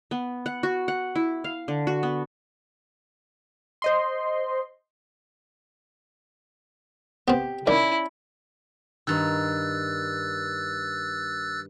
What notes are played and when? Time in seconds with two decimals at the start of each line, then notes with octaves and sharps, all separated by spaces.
0.11 B3
0.46 F#5
0.63 F#4
0.88 F#5
1.16 E4
1.44 F5
1.68 D3
1.87 F#4
2.03 B3
3.82 C5 D#5 C6
7.28 B3 C4 G4
7.67 D#3 C#4 E4 D5
9.07 G2 D#3 E6 F#6 A6